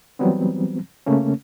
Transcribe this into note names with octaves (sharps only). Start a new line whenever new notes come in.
E3 F#3 G3 B3 C4
C#3 A3 A#3 C#4